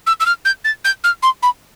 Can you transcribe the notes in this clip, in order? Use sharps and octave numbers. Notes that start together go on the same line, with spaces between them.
E6
E6
F6
G6
A6
G6
F6
C6
B5